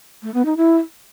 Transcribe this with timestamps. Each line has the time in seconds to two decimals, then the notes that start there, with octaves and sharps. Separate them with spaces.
0.23 A3
0.34 B3
0.45 D#4
0.57 E4